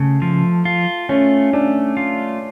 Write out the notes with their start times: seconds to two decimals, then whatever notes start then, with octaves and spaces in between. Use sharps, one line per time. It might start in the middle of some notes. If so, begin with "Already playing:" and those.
Already playing: C#3 A3
0.22 F3
0.65 F4
1.09 A3 C#4
1.53 A3 D4
1.97 F4